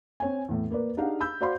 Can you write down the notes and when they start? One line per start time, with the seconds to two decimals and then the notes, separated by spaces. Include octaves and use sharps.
0.20 C4 C#5 G#5
0.49 E2 A2
0.70 A#3 A#4 B4 D5
0.97 D4 D#4 G4 G#4 F5 F#5
1.20 B5 E6 G6
1.41 F#4 C5 D5 F5 B5 C6